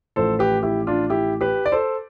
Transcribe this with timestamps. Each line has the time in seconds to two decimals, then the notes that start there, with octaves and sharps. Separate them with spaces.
0.16 A1 A2 F3 A4 C5
0.39 G4 B4
0.63 E4 G4
0.87 D4 F4
1.10 E4 G4
1.41 G4 B4
1.66 D5
1.72 A4 C5